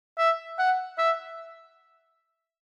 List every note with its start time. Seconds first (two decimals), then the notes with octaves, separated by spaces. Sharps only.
0.18 E5
0.59 F#5
0.98 E5